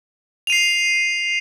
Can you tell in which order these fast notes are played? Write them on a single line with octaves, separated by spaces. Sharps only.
F7 D#7 C7